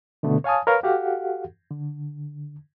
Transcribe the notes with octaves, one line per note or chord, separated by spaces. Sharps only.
B2 D3 A3 B3
C#5 F5 G#5 A5 D#6
A#4 B4 C#5 F5
F#4 G4 A4 F5 F#5
D3